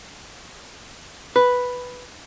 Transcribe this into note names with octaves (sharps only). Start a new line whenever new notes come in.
B4